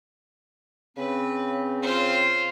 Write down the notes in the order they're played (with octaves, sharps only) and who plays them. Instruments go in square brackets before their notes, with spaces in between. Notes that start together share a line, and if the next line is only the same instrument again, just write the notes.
[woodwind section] C#3 C4 [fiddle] B4
[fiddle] F4 C5